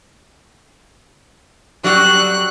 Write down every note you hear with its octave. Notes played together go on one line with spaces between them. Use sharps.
F#3 G3 F#4 F#6